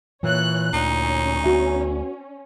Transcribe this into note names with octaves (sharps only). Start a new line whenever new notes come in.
A#2 E3 C#5 F#6
D2 C#4 D#4
B3 F#4 E5